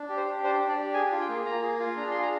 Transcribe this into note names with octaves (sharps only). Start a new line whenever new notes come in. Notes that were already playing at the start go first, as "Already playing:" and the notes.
Already playing: D4
G4
C5
G4
D4 C5
D4
D5
G4
G#4 G#5
F4
G5
A#3
A#3 A#5
G#4
F4
D4 A#5
G#4 C6
A#5